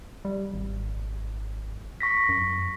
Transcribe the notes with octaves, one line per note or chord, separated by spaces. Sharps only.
G3
G#1
C#6 A#6 B6
F#2